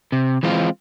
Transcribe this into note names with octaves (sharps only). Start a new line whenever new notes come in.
C3
E3 G#3 C4 F4